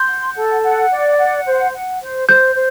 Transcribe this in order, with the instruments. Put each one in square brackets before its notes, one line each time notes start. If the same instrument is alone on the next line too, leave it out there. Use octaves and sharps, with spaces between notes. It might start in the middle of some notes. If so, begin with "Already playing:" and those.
Already playing: [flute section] C6 [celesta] G6
[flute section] F#5
A4
F#5
D5
F#5
C5
F#5
C5
[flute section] C5 [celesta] G6
[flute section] C5